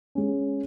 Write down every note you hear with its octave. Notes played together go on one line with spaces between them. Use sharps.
G#3 C#4